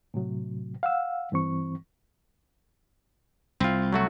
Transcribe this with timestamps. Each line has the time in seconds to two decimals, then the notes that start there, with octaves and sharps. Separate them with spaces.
0.14 A2 C3 F#3
0.83 F5 F#5 E6
1.32 G2 E3 C4 C#6
3.60 C2 C4 F4
3.93 F#3 A3 F#4